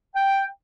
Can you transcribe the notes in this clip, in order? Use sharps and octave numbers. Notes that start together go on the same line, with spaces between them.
G5